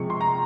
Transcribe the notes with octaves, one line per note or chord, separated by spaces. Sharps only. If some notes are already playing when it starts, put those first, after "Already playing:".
Already playing: C3 F3 G#3 C#6
C6
A#5